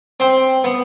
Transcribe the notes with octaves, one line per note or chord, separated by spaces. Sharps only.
C4
B3